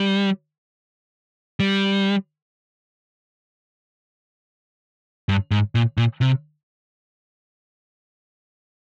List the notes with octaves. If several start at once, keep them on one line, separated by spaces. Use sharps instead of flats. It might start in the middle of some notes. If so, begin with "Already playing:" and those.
Already playing: G3
G3
G2
G#2
A#2
A#2
C3